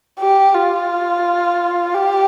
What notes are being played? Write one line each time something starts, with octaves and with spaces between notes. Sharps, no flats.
G4
F4
G4